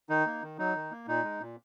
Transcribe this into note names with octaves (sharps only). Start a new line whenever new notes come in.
D#3 D#4
A#3
D#3
F#3 D#4
D#3
A#3
A#2 D#4
G#3
A#2